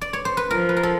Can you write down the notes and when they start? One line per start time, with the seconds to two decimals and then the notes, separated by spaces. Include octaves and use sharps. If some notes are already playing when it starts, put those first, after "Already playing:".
0.01 D5
0.13 C#5
0.25 C5
0.37 B4
0.51 F3 A#4
0.69 B4
0.77 A#4
0.83 A4